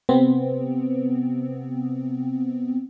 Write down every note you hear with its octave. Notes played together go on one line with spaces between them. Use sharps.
C3 B3 C4